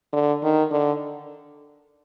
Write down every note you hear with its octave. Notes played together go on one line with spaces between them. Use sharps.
D3
D#3
D3